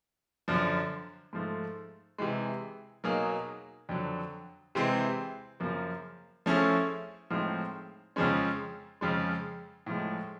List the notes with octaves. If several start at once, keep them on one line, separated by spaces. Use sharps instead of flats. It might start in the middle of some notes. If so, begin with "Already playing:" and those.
F#2 D3 F3
G#2 F3 A3
C3 E3 G#3
B2 F#3 A#3 D#4 G#4
F2 D3 F#3
C3 E3 G#3 C4
F#2 C#3 F3 A#3
F3 A3 C#4 E4 G#4
A2 F3 G#3 C4 D#4
F2 C#3 F3 G#3 C#4
F2 C#3 F3 G#3
A2 F3 G#3